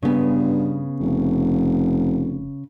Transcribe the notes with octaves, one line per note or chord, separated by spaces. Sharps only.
G2 C#3 B3
F1